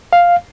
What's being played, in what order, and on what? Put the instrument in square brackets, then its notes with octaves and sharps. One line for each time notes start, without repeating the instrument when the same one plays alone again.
[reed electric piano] F5